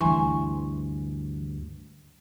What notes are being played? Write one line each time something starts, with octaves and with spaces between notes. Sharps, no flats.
D2 G2 E3 G#5 C6 C#6